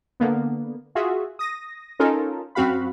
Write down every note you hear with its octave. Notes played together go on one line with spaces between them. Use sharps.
D3 A#3 B3
F4 F#4 G#4 E5
D#6 A#6
C#4 D#4 F4 A4 A#4
F#2 C4 F#4 F5 B5